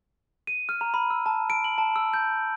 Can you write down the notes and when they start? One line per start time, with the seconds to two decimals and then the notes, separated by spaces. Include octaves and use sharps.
0.47 D#7
0.69 F6
0.81 A#5
0.94 B5
1.10 E6
1.26 A5
1.50 D7
1.64 F#7
1.78 A5
1.96 E6
2.14 G6